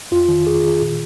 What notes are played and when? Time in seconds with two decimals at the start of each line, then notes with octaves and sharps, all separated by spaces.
0.11 F2 F4
0.28 D#3
0.46 F2 G#4
0.63 D#3
0.81 A#2